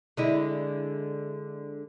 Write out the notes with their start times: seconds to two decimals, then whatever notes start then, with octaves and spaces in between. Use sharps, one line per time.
0.17 D3 G#3 E4